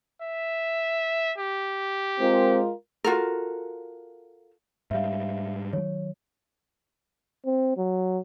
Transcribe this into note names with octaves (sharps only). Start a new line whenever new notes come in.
E5
G4
G#3 C4 F4 A#4
F4 F#4 A4 A#4
G#2 G3 E5 F5
D#3 F#3 C#5
C4
F#3